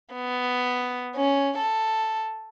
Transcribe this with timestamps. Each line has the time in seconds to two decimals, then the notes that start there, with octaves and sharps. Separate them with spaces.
0.14 B3
1.15 C#4
1.58 A4